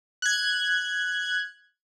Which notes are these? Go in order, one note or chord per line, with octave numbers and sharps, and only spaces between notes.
F#6 G#6